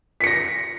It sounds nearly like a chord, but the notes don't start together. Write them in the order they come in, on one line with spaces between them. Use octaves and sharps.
B6 C#7 A#6